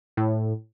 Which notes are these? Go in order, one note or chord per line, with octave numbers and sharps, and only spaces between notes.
A2